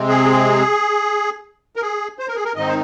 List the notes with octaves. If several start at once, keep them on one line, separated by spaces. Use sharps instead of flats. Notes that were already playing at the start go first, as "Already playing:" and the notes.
Already playing: C3 G#3 C4
G#4
A#4
G#4
C5
A#4
G#4
A#4
G#2 D#3 C4 D#4 D#5
C5